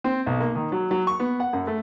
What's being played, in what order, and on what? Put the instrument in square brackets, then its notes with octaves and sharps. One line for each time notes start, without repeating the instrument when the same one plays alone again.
[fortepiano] C4
B1
A#3
D#3
F#3
F#3
C#6
B3
F#5
F#2
A3